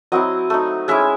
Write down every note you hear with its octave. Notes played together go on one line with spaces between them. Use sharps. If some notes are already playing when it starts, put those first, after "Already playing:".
F#3 C4 E4 D#5
A3 D#4
G#3 C#4 E4 E5